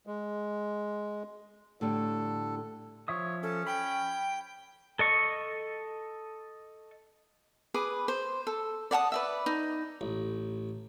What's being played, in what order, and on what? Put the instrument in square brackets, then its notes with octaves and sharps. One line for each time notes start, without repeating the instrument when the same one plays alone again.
[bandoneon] G#3
[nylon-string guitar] A2 D3 G3 [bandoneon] A4
[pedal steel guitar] F3 E5 D#6 [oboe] C#5
[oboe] C#4 [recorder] A4
[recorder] G5 [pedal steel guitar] B5
[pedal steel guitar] A4 D#5 C#6
[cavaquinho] G#4 B4 D6
C5
A4
D5 F#5 A5 D#6
B4 D5 E5
D#4
[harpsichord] A1